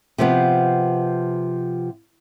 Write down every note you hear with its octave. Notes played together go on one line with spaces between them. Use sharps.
C3 F3 B3